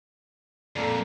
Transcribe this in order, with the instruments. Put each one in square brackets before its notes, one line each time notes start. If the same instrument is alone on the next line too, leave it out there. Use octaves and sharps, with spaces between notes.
[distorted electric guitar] F2 A#2 [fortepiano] A4 A#4 D5